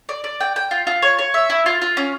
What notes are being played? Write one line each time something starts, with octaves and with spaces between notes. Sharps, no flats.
D5
D5
G5
G5
F4
F4
C#5
C#5
E5
E4
F4
F4
C#4